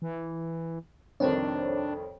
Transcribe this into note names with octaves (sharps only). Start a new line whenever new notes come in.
E3
C2 F2 D#3 D4 A4 C5 C#5